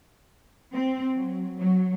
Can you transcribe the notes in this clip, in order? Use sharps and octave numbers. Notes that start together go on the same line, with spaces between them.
C4
F#3
F#3